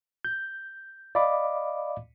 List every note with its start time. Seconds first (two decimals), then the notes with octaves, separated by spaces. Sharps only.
0.25 G6
1.15 D5 D#5 F5 B5 D6